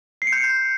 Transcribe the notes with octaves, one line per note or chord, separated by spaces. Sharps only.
C7
C#7
G6